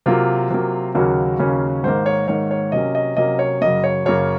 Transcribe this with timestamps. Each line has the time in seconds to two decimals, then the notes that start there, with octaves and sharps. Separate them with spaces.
0.06 C3 F#3 A#3 F4
0.51 C3 F#3 A#3
0.95 D#2 C#3 F#3 A#3 C#4 F#4
1.39 D#2 C#3 F#3 A#3 C#4
1.83 G#2 D#3 A#3 C5
2.06 C#5
2.28 G#2 D#3 A#3 C#5
2.51 C#5
2.72 C3 F#3 A#3 C#4 D#5
2.95 D#5
3.17 C3 F#3 A#3 C#4 D#5
3.39 C#5
3.61 F#2 C#3 F#3 A#3 D#5
3.84 C#5
4.06 F#2 C#3 F#3 A#3 C#5